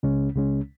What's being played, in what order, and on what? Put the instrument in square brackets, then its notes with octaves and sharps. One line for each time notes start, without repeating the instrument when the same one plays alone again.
[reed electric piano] C#2 C#3 G#3 C#4
C#2 C#3 G#3 C#4